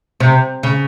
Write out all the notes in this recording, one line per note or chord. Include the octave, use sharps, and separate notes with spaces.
C3
C#3